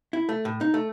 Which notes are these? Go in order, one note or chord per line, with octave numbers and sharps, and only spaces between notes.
E4
A3
A2
D#4
A3